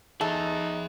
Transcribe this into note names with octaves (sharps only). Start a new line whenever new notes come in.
D#4 G#4 A4 E5